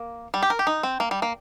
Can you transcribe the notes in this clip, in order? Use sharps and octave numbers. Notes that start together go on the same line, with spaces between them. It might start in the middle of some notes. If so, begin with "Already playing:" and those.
Already playing: A#3
G3
G4
A#4
G4
D#4
C4
A#3
G3
A#3